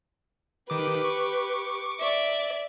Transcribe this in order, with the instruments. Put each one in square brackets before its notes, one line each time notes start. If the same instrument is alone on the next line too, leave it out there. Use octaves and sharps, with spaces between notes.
[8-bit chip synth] D#3 D6 [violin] G4 B4
[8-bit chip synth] C#6 D6
[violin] D5 E5